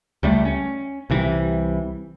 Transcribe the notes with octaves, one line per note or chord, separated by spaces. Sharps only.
C#2 G3 A3
C#4
C2 C3 E3 G3